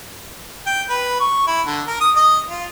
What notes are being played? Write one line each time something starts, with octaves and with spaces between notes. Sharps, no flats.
G5
B4
C#6
E4
D3
A#4
D#6
D#5
F4